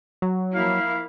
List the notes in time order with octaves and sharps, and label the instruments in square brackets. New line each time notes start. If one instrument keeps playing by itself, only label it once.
[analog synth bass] F#3
[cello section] F3 A#3 E4 [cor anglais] F5